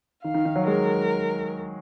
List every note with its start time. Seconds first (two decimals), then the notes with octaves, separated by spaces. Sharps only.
0.24 D#3 F5
0.34 D#3
0.45 D#3
0.56 F#3
0.67 G#3 A#4